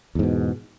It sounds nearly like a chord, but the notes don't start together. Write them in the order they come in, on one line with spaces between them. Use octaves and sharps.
E2 G#2 B2